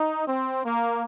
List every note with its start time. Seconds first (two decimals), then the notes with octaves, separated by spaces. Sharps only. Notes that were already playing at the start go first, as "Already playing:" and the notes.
Already playing: D#4
0.26 C4
0.64 A#3